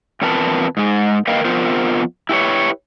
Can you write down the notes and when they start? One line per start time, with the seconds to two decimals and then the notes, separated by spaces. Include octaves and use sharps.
0.22 E2 F3 C4 A#4 B4 A5
0.77 G#2 G#3
1.27 A#3 A#4 B4 D#5 F5 G5
1.45 F2 B3 F4 A#4 C5
2.29 E4 G4 B4 C#5